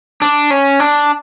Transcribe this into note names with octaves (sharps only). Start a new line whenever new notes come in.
D4
C#4
D4